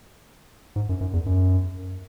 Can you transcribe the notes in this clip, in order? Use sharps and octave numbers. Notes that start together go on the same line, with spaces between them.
G#2
F#2
F#2
E2
F#2